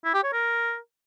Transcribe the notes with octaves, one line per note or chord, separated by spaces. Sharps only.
E4
G4
C#5
A#4